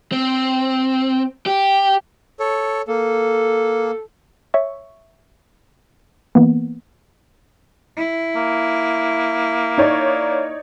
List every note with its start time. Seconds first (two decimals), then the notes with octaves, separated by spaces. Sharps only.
0.12 C4
1.46 G4
2.40 A4 C#5
2.88 A#3 A4
4.54 C#5 E5 C#6
6.35 E3 A#3 B3
7.96 E4
8.36 A#3
9.78 D#4 C#5 D5